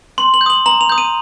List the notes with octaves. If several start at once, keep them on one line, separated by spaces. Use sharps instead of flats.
C6 F#7
F#7
G6
D#6 F#7
A#5 F#7
F7
D#6 G6
D#7